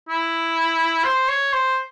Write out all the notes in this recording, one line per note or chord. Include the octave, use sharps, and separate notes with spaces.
E4
C5
C#5
C5